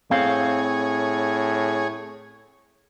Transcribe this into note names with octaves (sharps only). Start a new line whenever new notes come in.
A2 C4 G#4 C#5 F5